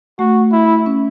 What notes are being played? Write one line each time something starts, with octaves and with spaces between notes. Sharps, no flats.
A3 F#4
E4
C#4